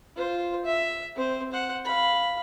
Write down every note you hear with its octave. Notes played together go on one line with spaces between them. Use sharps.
F4 C5
E5
C4 C5
C5 F#5
F5 B5